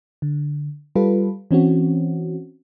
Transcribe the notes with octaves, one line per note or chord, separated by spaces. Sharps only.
D3
G3 F4 A4 B4
E3 C4 C#4 F#4